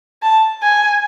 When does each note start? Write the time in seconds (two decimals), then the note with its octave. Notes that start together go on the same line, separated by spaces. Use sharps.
0.22 A5
0.63 G#5